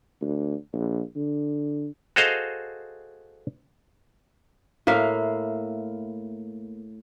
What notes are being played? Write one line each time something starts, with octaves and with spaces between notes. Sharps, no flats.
D2
A#1
D3
F#4 G#4 A4 C5 D#5 F5
A2 A#3 E5 F5